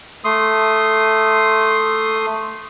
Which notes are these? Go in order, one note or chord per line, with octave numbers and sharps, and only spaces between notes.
A3 C6 D#6